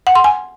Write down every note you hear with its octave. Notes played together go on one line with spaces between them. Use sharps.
F#5
C6
G#5